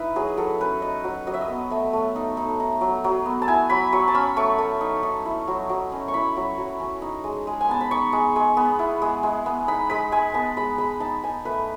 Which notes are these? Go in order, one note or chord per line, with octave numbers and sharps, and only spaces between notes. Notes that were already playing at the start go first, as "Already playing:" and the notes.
Already playing: D#4 E4 B4
F#3 G#4
F#3 A4
C#4 B4
D#4 D#5
F#3
F#3 D#5
E5
D#5
B3
A3 E5
A3
D#4
D#4
D#4
F#3
F#3
B3
A5
E4 G#5
F#3 B5
F#3 C#6
A5
C#4 B5
A3 C#6
A3
D#4
D#4
E4
F#3
F#3
C#4
C#6
E4 B5
F#3
F#3
C#4
D#4
G#3
G#3
G#5
B3 A5
B5
D#4 C#6
G#3
G#3
B3
E4
G#3
G#3
B3
D#4 B5
G#3 B5
G#3 G#5
B3 A5
G#3 B5
G#3 B5
D#4 A5
D#4 G#5
A3 B4